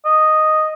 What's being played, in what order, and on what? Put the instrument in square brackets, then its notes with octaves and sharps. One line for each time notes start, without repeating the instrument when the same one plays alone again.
[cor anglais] D#5